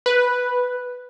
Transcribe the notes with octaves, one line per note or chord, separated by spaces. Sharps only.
B4